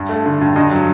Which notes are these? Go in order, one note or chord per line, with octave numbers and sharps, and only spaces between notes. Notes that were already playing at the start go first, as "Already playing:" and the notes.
Already playing: G2
A3
D3
G2
G2 D#5
F#3